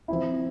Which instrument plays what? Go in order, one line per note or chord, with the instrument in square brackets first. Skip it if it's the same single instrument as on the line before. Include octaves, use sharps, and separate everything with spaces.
[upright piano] F3 C4 E4